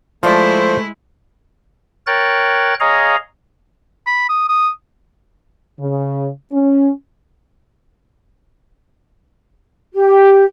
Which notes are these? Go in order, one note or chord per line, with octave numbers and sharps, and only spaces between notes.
F3 G#3 A3 E4 C5 D5
A#4 C#5 G5 F#6 A6
G#4 C#5 D#5 F5 A#5
B5
D#6
D#6
C#3
C#4
G4